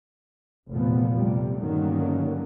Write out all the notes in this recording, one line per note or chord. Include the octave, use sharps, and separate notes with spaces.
F1 E2 A#2 F3 B3
C3 G3 A3
G2 D3 D#3 F#3 A#3 C#4